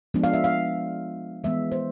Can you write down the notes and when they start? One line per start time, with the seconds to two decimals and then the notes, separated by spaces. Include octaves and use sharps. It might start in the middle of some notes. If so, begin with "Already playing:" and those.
0.14 F3 G#3 B3 D4
0.24 F5
0.34 E5
0.44 F5
1.44 E3 G#3 B3 E5
1.72 C5